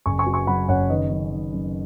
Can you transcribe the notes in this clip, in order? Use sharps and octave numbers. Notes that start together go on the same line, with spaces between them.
F#1 G#5 C#6
G#5 C#6
F#3
G#5 C#6
F#2 F#5 B5
F#1 C#5 F#5
D#3 B4 D#5
F#2
D#3
F#2